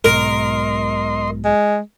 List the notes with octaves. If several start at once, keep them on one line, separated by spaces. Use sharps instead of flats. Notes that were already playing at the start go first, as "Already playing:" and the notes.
B1 G#2 B2 A#4 D#5 C6
G#3